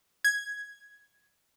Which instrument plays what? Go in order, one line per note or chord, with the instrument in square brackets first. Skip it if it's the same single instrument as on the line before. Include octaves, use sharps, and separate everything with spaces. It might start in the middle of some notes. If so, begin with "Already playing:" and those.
[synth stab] G#6